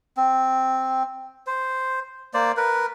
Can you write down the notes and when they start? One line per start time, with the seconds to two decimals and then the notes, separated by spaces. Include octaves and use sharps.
0.17 C4
1.47 C5
2.34 A#3 C5 D5
2.57 A#4 B4